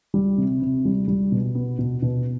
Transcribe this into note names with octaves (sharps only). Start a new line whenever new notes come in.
G3
C3
C3
G3
G3
B2
B3
B2
B2